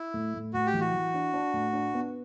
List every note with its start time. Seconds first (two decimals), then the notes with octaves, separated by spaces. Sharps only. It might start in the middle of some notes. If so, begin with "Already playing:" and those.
Already playing: E4
0.14 A2
0.34 A2
0.53 A2 F#4
0.67 G4
0.74 E3
0.80 F#4
0.94 E3
1.14 D4
1.34 D4
1.54 A2
1.73 D4
1.94 B3